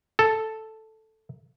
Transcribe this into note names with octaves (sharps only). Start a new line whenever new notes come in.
A4